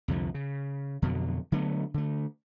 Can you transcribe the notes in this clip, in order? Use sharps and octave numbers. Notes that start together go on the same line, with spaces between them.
C2 F2 D3 F3
C#3
F2 B2 D3 F#3
D3 F#3 A3 B3
D3 A3